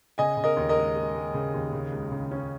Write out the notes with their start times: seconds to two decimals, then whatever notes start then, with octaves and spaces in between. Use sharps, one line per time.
0.18 C#3 D#5 G#5
0.37 C#3
0.44 A#4 D#5
0.57 D#2
0.69 A#4 D#5
0.76 G#3
0.96 G#3
1.15 G#3
1.34 C#3
1.54 D#2
1.73 C#3
1.92 C#2
2.12 C#3
2.31 C#4